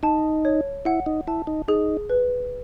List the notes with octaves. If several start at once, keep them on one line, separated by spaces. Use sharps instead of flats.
D#4 A5
C#5
E4 F#5
D#4
E4 A5
D#4
D#4 G#4
B4